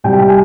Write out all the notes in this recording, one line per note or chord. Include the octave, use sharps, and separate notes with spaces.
C2 C3 G3 G5
G5
G#5